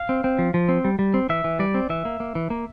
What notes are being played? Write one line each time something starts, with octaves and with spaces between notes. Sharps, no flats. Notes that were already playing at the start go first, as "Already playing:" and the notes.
Already playing: F5
C4
C4
F3
F3
C4
G3
G3
C4
E3 E5
E3
G3 D5
C4
E3 E5
A#3
A#3
E3
A#3